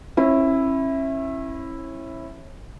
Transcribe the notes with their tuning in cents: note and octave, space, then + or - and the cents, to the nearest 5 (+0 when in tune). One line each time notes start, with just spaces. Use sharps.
C#4 -35 E4 +0